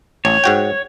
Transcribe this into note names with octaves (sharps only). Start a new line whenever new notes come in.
A1 C#5
G#2 F#4 G5